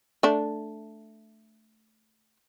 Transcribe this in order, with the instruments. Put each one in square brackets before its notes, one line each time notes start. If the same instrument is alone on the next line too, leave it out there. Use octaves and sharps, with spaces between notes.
[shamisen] A3 D4